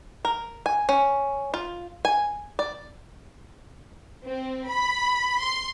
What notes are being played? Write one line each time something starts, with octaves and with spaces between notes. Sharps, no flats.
A#4
G#5
C#4
F4
G#5
D5
C4
B5
C6